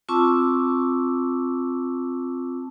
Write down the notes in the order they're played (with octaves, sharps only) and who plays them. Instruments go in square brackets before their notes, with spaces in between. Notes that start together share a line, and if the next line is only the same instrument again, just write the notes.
[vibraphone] C4 F4 A5 C#6 D6 E6